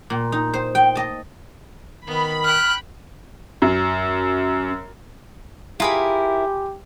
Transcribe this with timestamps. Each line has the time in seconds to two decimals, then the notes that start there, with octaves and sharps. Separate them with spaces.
0.10 A#2
0.32 D#4
0.54 C5
0.75 G5
0.95 D#5 A5
2.07 D#3 B3 B5
2.44 G5 F6 F#6
3.62 F#2
5.80 E4 F4 G4 G#4 A#4 B5